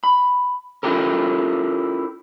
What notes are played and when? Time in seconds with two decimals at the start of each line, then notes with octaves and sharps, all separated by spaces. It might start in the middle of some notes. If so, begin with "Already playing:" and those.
0.04 B5
0.83 C#4 E4 F4 G4 A4 A#4